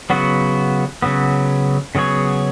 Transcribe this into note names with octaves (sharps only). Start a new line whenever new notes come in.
C#3 F#3 B3 F#4
C#3 F#3 B3
C#3 F#3 B3 G#4 C#5